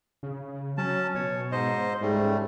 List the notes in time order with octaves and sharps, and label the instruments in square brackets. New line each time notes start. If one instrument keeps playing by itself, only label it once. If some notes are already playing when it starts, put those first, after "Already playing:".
[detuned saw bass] C#3
[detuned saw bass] F#3 [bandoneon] C#4 A5
[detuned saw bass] B2 [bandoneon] C#5
[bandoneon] G#2 C5 D#5
[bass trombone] G#2 [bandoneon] G3 A3 [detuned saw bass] C#4